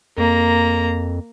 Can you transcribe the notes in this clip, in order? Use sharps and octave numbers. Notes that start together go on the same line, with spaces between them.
F2 A#3 A#5